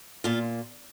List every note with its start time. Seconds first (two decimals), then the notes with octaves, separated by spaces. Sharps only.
0.24 A#2 F4